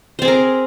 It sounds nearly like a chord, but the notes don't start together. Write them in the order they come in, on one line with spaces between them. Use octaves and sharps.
C5 C4 G#4 A#4